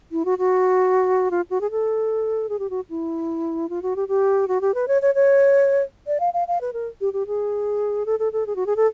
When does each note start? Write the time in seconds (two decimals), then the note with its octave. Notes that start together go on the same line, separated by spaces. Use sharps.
0.12 E4
0.25 F#4
0.38 F#4
1.31 F4
1.50 F#4
1.61 G#4
1.71 A4
2.49 G#4
2.59 G4
2.70 F#4
2.90 E4
3.69 F4
3.82 F#4
3.96 G4
4.08 G4
4.48 F#4
4.61 G4
4.74 B4
4.88 C#5
5.02 C#5
5.15 C#5
6.07 D5
6.20 F5
6.34 F5
6.48 F5
6.61 B4
6.73 A#4
7.01 G4
7.13 G4
7.27 G#4
8.06 A4
8.19 A4
8.32 A4
8.46 G#4
8.56 F#4
8.66 G#4
8.76 A4